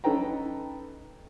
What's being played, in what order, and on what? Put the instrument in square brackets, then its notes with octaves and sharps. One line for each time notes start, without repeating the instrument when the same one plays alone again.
[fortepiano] C#4 D#4 A4 B4 G5 A#5